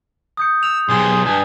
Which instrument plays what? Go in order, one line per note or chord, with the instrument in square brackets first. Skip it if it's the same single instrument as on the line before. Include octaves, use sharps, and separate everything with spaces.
[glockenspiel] D#6 G6 C#7
[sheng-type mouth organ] E6 [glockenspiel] F7
[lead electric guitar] B1 C3 [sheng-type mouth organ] G#4 C6
[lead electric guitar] G2 [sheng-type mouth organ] G#5